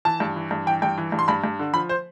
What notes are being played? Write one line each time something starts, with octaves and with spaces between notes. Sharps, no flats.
E3 A5
G2
E3
G2
E3 G5
G2 G5
E3
G2
C6
G2 B5
G2
D3
F3 B5
C5